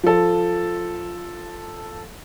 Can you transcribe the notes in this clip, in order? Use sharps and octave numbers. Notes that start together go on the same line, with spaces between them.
F3 A4